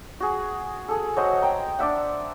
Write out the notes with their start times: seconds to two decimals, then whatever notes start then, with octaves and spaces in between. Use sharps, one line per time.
0.20 F#4 G#4
0.88 G#4 A4
1.17 F#3 C5 D#5 F#5
1.42 G5 A#5
1.79 D4 D5 E5 F#5